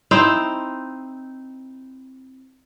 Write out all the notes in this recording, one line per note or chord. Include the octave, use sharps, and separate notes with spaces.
C4 D#4 E4 C5